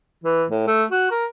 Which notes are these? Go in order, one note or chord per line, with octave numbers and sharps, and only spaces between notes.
E3
A2
A3
F#4
A#4